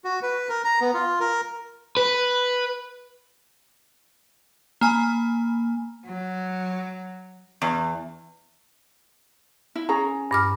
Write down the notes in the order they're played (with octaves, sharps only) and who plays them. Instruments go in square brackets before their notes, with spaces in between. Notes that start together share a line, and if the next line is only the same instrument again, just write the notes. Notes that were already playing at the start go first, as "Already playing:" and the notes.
[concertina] F#4
B4
A#4
A#5
B3
F4
A#4
[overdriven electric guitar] B4
[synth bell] A#3 G#5 B5
[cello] F#3
[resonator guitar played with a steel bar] E2
[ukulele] E4
C#4 G#4 A#5
[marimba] G2 D6 F6